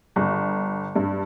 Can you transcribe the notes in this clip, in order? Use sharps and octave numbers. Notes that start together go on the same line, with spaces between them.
G1
G2